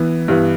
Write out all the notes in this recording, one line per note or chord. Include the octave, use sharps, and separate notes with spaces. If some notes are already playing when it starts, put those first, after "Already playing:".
Already playing: E3 B3
G2 E3 B3